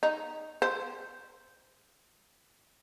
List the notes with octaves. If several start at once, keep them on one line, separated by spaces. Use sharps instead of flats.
D#4
C5